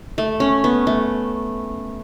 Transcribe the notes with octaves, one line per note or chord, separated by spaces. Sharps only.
A3
C#4
B3
A3